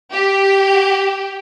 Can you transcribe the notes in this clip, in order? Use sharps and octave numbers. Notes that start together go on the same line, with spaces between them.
G4